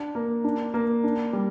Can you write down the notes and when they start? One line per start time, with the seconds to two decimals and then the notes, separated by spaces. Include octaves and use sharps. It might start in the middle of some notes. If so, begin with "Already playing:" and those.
Already playing: D4
0.15 A#3
0.44 D4
0.74 A#3
1.04 D4
1.33 G3